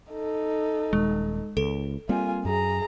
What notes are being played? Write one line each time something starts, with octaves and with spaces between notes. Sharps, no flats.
D#4 A4
D#1 G#3
C#2 A4
G3 A#3 C4 F4 G#5
F#2 G#4 A#5